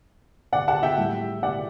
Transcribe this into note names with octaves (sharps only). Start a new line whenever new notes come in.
D5 F#5
F#5 A5
E5 G5
A2 G3
D5 F#5